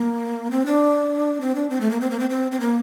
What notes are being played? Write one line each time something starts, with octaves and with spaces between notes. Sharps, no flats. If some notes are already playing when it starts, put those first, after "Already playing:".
Already playing: A#3
C4
D4
C4
D4
C4
A3
A#3
C4
A#3
C4
C4
C4
A#3